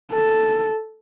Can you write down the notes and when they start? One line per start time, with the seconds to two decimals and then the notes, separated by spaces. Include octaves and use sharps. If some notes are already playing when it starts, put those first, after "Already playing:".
0.13 A4